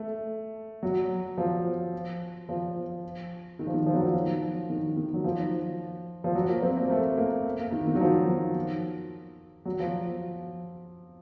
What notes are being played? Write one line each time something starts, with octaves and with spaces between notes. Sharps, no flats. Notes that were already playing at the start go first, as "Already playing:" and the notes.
Already playing: A3
F#3
F3
F3
D#3
F3
D#3
F3
F#3
F3
F3
D#3
D#3
F#3
F3
F3
F#3
A#3
C4
A#3
A3
A#3
A#3
D#3
D#3
F#3
F3
F#3
F3